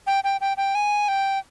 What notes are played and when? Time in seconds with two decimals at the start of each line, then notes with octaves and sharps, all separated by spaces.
0.07 G5
0.24 G5
0.41 G5
0.57 G5
0.75 G#5
1.08 G5